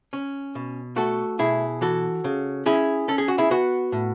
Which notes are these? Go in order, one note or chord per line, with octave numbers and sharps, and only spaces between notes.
C#4
B2
A3 F#4 A4
B2 E4 G#4
E3 F#4 A4
C#3
C#4 E4 G#4
C#4 A4
G#4
F#4
E4 G#4
B3 F#4
A2